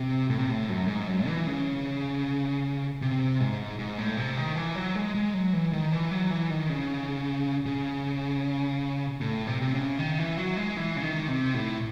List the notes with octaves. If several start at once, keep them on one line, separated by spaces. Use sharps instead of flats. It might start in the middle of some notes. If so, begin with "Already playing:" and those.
Already playing: C3
A2
C3
A2
F#2
G#2
F#2
E3
C#3
C3
G#2
G#2
A2
C3
D#3
E3
F#3
G#3
G#3
F#3
E3
D#3
E3
F#3
E3
D#3
C#3
C#3
A2
C3
C3
C#3
D#3
E3
F#3
G#3
E3
C#3
D#3
C3
A2